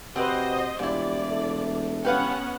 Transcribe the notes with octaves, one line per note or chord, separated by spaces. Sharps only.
C3 C4 F#4 G4 B4 C5 D#5
E1 A#2 G3 E4 D5
A3
B3 C#4 G4 B4 F5 F#5